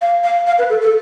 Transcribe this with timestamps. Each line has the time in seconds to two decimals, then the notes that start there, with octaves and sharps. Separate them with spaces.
0.02 F5
0.24 F5
0.47 F5
0.59 B4
0.70 A4
0.82 A4